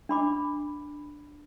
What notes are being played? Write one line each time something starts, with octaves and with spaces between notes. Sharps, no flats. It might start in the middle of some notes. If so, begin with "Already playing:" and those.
D4 B5 D6